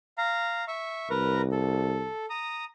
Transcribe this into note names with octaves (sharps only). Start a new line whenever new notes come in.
F5 A#5
E5 C#6
C2 A#4 B4 A#5
A4
A#5 D#6